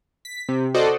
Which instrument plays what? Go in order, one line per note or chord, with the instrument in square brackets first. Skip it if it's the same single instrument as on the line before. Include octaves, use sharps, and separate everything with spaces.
[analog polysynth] B6
C3
F#4 A4 C5 D5 D#5